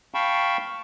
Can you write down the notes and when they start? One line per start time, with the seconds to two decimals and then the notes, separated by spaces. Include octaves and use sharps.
0.14 F5 G5 A5 B5 C#6